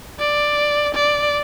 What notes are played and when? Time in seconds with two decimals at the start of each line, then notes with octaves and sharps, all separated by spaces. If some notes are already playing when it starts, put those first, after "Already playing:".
0.20 D5
0.94 D5